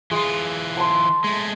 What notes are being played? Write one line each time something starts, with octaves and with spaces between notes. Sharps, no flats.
E3 G#3 F4
A5 C6
G#3 A3